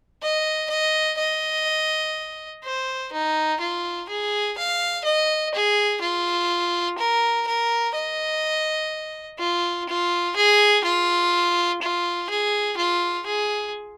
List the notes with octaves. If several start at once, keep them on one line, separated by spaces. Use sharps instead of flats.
D#5
D#5
D#5
C5
D#4
F4
G#4
F5
D#5
G#4
F4
A#4
A#4
D#5
F4
F4
G#4
F4
F4
G#4
F4
G#4